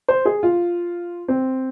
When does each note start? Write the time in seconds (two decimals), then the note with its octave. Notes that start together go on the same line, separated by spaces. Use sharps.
0.08 C5
0.25 G#4
0.43 F4
1.28 C4